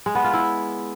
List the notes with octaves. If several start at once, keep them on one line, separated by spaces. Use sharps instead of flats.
G#3
B3
F4
E4